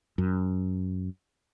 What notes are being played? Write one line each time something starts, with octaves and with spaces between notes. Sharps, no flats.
F#2